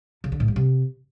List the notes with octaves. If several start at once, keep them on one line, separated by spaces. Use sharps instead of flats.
C#3
D3
A2
G3
C3